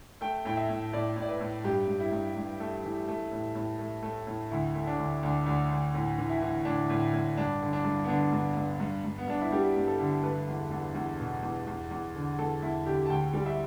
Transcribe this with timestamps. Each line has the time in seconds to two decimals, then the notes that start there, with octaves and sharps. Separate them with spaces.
0.21 A3 G5
0.45 A2 G5
0.57 E5
0.69 A2
0.93 A2 D5
1.16 A2
1.22 D5
1.29 B4
1.40 A2
1.64 G2 G4
1.88 G2
2.00 E4
2.12 G2
2.36 G2
2.60 A3
2.84 E3
3.08 A3
3.32 A2
3.55 A2
3.79 A3
4.03 A3
4.27 A2
4.51 D2 E4
4.75 A3
4.87 D4
4.98 D2
5.23 D2 D4
5.46 D2 D4
5.71 D2
5.94 A2
6.18 E3
6.29 E4
6.41 E3
6.65 A2 D4
6.90 A2
7.13 A2
7.37 G2 D4
7.62 D3
7.73 D4
7.85 G2
8.04 B3
8.08 D3 D4
8.32 G2
8.57 G2
8.80 G2
9.05 G2
9.18 B3
9.28 G2 D4
9.41 E4
9.52 G3 G4
9.76 G2
9.87 A4
9.99 D3
10.23 A3 B4
10.48 E2
10.71 E2
10.95 E2
11.19 B2
11.43 E2
11.67 E2
11.91 E2
12.15 D3
12.39 E2 A4
12.62 E2 E4
12.86 D3 G4
13.06 A5
13.10 D2 G5
13.33 G3
13.46 E5